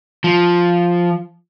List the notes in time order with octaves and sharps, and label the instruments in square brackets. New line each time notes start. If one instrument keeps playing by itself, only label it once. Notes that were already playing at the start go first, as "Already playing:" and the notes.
[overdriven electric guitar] F3